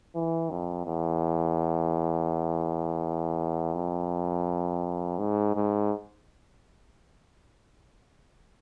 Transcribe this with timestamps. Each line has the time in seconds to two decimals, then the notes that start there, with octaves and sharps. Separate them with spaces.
0.15 E3
0.51 F2
0.86 E2
3.74 F2
5.18 G#2
5.55 G#2